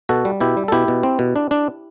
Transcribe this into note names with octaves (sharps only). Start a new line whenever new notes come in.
B2 F#4 A4
G3
B2 E4 G4
G3
A4
B2 E4 G4
B2
C4
B2
D4
D4